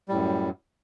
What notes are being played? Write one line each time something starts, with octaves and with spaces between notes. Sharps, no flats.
F#2 A2 G3